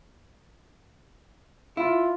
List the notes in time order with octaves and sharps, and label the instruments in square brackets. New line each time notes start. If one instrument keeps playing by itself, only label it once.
[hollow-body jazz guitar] E4 [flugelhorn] F4